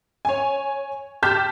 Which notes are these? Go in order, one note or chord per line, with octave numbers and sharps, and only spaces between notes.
C#5 G#5
G4 A5 F6 G6 B6 E7